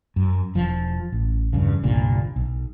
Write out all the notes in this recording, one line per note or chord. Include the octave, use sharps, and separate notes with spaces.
F#2
E1 F3
A1
E2 G2 C#3
G1 C2 A#2 D3
B1